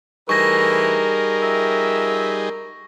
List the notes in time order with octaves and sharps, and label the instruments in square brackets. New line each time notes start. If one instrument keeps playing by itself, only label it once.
[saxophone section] A2 E3 [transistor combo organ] G3 D#4 G#4 [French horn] A#4 [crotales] C#6 A#6
[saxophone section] F2 E5